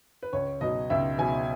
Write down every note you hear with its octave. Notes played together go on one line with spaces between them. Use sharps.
B4
C#2 C#5
B2 F#3 D#5
C#2 E5
B2 F#3 G#5